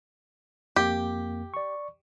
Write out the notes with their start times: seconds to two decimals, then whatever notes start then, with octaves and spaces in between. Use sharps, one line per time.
0.76 F2 A#3 G4
1.54 D5 C#6